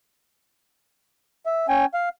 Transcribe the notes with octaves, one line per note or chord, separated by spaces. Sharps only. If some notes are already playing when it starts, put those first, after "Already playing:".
E5
C#4 G5 G#5
F5